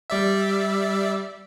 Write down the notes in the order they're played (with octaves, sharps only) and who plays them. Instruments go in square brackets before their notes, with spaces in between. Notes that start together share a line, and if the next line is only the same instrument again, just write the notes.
[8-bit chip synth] G3 D5 E5